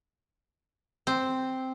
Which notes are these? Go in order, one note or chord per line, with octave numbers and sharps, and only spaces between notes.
C4